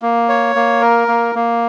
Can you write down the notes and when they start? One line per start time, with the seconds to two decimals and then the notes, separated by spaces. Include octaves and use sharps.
0.02 A#3
0.29 C#5
0.55 A#3
0.81 A#4
1.08 A#3
1.35 A#3